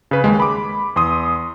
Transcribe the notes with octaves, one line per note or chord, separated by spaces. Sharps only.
C#3 B4
D#2 G#3
B5 D6
E2 C6 D#6